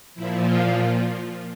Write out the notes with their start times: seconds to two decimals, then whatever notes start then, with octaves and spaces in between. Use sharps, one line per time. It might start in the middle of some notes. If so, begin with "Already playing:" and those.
0.15 A#2 F3 E4
0.46 F4